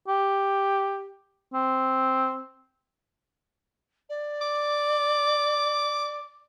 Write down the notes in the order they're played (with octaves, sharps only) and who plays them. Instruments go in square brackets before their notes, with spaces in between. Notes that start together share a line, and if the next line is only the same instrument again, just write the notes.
[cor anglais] G4
C4
[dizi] D5
[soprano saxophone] D6